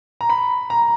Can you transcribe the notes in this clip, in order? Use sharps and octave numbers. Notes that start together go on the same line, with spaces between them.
A#5
B5
A#5